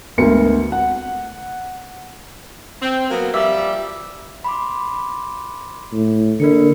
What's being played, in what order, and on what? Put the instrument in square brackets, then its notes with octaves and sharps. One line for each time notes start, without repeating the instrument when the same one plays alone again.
[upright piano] G#1 D2 B3 A#4 C#7
F#5
[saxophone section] C4
F#3 A#3 B3
[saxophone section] F3 G3 [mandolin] E5
[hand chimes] B5 C6 D6
[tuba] A2
[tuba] D3 [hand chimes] A#3 A#4 C#7